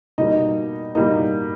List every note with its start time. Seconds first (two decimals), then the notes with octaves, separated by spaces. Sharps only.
0.18 B2 G3 A#3 D#4 D#5
0.95 B2 G3 A#3 D#4 D#5